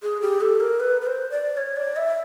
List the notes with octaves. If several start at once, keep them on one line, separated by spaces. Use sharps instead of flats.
G#4
G4
A4
A#4
B4
B4
C5
D5
C#5
D5
E5